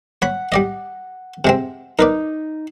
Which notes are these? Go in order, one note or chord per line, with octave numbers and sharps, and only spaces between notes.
C#5 F#5 B5
G3 D5 D#5
C3 G#3 C4
D#4 A#4 B4 D5